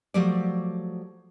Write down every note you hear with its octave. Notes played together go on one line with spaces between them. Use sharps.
F3 F#3 A3 G4 D5